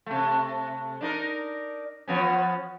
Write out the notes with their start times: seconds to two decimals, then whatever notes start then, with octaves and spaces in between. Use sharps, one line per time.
0.06 C3 A3
1.01 D4 D#4 A#4
2.08 F3 B3 C#4